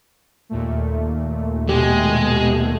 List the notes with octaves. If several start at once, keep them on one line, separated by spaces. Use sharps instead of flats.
D#2 A#2 A3
B2 G#3 G4